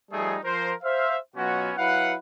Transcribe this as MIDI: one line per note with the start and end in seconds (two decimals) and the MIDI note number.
0.11 0.37 53
0.11 0.37 55
0.11 0.37 57
0.11 0.37 63
0.11 0.37 68
0.44 0.73 53
0.44 0.73 70
0.44 0.73 72
0.83 1.17 72
0.83 1.17 76
0.83 1.17 77
1.36 1.72 47
1.36 1.72 54
1.36 1.72 59
1.36 1.72 61
1.36 1.72 65
1.36 1.72 66
1.77 2.15 54
1.77 2.15 64
1.77 2.15 71
1.77 2.15 77
1.77 2.15 78